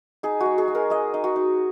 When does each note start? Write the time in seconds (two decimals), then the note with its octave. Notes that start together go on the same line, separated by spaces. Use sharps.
0.23 D#4 G#4
0.40 F#4
0.46 G#3
0.58 G#4
0.68 G#3
0.75 A#4
0.90 G#3 D#5
1.14 D#4
1.24 F#4
1.36 D#4